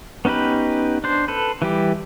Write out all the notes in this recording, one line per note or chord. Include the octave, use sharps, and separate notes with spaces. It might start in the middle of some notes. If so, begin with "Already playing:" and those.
B3 C#4 D#4 G4 B4
D4 C5
A4 B4
E3 G3 G4